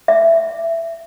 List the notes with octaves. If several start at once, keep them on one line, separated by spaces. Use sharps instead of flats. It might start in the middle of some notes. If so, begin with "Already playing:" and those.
E5